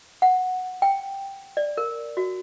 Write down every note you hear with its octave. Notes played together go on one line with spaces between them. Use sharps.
F#5
G5
D5
A#4
F#4